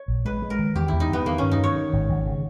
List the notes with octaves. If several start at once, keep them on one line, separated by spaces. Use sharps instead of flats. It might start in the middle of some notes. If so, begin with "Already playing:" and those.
Already playing: C#5
A#1
G#3 B4
G#3
A#4
D#3
E2 G4
E2 E4
D#4
E2 B3
D#3 A#3
G2 C#4
D#4
D#3 C#5
D#3
G#1
G#1
C#3